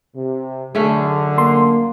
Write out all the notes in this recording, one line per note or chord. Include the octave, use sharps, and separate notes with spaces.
C3
F#2 D3 A3 C#4 G#4
A#3 C6